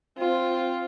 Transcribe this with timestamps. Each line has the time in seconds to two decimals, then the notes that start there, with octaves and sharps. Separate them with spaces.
0.18 C4 F4